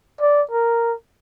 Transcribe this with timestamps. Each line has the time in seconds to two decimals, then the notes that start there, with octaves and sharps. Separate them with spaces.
0.21 D5
0.51 A#4